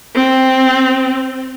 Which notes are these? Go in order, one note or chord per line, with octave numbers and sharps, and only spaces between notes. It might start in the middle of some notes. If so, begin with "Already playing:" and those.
C4